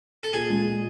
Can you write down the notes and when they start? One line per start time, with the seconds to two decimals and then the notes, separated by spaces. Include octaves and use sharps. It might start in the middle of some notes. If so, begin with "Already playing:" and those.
0.23 A4
0.33 A#2 G#4
0.50 G#3
0.65 A#2